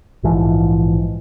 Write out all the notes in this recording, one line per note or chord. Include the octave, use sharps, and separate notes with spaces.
A#1 G#2 E3 F3